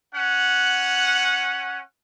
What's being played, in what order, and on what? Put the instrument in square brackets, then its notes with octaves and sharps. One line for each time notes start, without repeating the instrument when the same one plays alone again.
[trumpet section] C#4 F#5